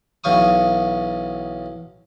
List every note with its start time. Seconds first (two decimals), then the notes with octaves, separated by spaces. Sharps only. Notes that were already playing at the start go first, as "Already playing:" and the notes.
0.24 B1 E3 F#3 F5 C#6 D#6